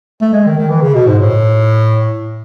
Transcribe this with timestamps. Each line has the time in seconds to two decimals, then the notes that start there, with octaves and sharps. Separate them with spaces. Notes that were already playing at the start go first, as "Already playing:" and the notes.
0.21 A3
0.33 G#3
0.46 D#3
0.58 D#3
0.70 E3
0.82 C#3
0.94 B2
1.07 G#2
1.20 A2